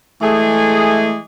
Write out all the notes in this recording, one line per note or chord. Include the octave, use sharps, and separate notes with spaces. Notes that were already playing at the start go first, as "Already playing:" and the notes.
E3 G#3 A3 G#4